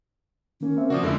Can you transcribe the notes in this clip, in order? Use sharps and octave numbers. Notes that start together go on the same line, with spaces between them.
D#3 A#3 C#4
A#3 C4 E5
C#3 F3 A#3 F#4 D5 D#6
F2 D3 G#3 E4 E5